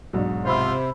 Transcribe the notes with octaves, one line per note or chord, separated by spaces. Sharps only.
B1 G#2 F#3 D4
C3 F4 C5 B5 E6